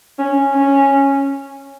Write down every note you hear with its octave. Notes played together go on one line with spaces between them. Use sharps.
C#4
C#4